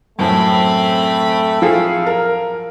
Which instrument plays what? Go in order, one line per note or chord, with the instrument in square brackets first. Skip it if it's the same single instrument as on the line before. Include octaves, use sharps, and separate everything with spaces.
[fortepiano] F#2 A2 [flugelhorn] A3 [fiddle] C4 B5
[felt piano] F3 G#4 A4 [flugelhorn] F5
[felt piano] A#4